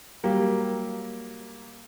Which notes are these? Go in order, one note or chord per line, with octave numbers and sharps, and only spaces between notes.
F#3 G3 A#3 G4